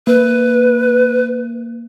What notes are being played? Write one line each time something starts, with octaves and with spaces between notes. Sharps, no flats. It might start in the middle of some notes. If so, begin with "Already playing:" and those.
A#3 B4